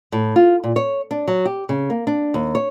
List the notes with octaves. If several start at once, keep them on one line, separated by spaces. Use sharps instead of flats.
A2
F4
A#2
C#5
D4
F#3
G4
C#3
A#3
D4
D#2
C#5